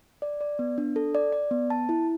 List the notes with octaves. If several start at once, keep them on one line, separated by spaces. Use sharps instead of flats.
D5
D5
B3
D4
A4
D5
D5
B3
A5
E4